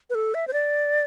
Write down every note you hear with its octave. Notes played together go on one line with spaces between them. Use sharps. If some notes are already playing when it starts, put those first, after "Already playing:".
B4
A4
E5
C5
D5